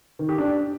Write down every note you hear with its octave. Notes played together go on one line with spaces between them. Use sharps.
D#3
G4
D4